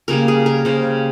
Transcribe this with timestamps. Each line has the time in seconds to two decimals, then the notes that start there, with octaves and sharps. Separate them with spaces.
0.08 C#3 G3 A#3 A#4
0.28 G#4
0.46 A#4
0.65 C#3 G3 A#3 C5